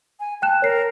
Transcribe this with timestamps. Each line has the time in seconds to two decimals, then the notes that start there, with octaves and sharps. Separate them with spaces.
0.20 G#5
0.42 G5 A5 F#6 E7
0.62 A#4 C#5 C7